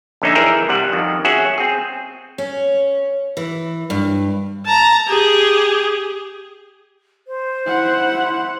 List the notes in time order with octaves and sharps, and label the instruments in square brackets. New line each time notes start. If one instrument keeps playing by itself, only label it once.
[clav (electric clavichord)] A#1 D3 C#4 D#4 E5
E3 G#4 A#4 E5 G5 A#5
C3 G3 F#5
F2 D#3
C#4 F#4 G#4 E5 F#5
C4 G#4
[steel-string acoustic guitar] C#4
E3
G2
[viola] A5 A#5
G4 G#4
[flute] C5
[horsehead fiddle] E4 F#5